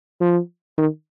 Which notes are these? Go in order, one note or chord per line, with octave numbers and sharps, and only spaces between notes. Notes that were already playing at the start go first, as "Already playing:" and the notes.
F3
D#3